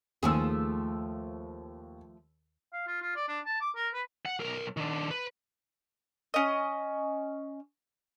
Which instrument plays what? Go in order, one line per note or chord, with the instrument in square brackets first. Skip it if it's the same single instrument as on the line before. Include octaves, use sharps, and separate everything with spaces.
[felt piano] D#2 E6 [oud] F3 A3 G#4
[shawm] F5
F4
F4
D5
D4
A5
D6
A#4
B4
[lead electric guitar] F#5
B1 A#4
D#3 D4
B4
[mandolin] C#4 D#5